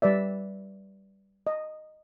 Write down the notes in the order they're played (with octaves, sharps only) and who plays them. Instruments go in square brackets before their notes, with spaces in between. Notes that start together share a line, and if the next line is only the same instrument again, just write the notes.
[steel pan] G3 B4 D5 E5
D#5